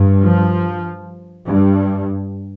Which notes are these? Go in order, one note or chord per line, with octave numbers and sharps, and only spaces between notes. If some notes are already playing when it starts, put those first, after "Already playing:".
Already playing: G2
F3
G2